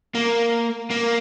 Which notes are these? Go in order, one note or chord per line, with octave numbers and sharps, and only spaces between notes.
A#3
A#3